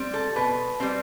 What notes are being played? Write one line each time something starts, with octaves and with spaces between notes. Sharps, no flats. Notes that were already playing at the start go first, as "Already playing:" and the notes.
Already playing: G3 C4
A4
B2 B4
G3 C4